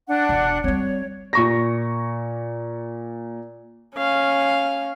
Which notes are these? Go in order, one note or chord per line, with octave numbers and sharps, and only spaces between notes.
D4 F#5
E1
G3 C4 C#5
A#2 C#6 A#6
C#4 F5